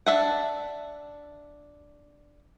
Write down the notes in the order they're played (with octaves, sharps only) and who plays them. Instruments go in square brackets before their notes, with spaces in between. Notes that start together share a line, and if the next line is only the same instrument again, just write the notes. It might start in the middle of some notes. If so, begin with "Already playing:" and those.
[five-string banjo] D4 E5 F#5